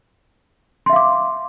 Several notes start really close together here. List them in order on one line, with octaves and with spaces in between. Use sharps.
C6 E5 F5 D6